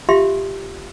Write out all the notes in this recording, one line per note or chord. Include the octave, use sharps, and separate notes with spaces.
F4 G4 E5 F5 C6